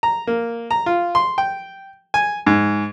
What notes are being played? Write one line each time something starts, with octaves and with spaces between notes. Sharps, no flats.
A#5
A#3
A#5
F4
C6
G5
G#5
G#2